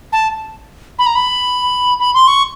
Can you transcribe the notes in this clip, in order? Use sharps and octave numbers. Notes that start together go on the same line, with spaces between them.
A5
B5
A#5
B5
B5
C6
C#6